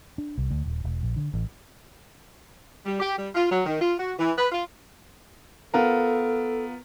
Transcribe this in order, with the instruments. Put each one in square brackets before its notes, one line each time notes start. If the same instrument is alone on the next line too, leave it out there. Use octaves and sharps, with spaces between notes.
[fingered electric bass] D4
C2
D2
D#1
E1
A#1
D3
A1
[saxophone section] G3
G4
G3
F4
F#3
D#3
F4
F#4
E3
B4
F4
[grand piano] B3 F4 A#4 [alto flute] A4